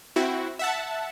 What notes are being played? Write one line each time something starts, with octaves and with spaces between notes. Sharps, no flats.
C4 E4 F#4
E5 F#5 A5